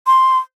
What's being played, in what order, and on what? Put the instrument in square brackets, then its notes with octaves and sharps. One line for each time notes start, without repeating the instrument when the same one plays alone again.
[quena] C6